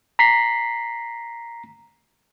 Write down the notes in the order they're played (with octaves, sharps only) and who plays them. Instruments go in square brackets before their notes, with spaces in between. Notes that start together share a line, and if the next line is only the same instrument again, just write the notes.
[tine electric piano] A#5 B6 C7